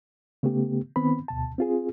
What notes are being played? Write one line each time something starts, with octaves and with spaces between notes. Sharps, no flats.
C#3 A3 B3 G4
D#3 B3 C4 B5
D2 B2 A5
C4 F4 G#4